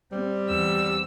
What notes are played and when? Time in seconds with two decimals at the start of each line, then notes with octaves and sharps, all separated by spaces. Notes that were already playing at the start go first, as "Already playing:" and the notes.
0.12 G3 C4
0.48 E2 E6